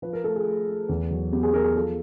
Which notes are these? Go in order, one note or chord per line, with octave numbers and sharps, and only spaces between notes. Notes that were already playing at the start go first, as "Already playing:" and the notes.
F3 B4
A#4
A3 A4
G#4
A3
A3
E2
F#3
B3 G4
G#4
B3 A#4
G#4
F3 A4